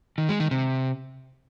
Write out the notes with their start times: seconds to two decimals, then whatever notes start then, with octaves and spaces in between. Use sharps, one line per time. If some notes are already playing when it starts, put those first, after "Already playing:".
0.18 D#3
0.29 G#3
0.40 D#3
0.51 C3